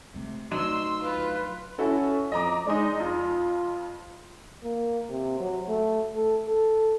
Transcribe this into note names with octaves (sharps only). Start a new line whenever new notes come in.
C3 A3
D2 F#3 D4 D#4 C6 E6
F4 B4
C#4 E4 F#4 A4
F2 D#5 A#5 D6
G#3 D4 D#4
F2 F4
A#3
C3
F#3
A3
A4
A4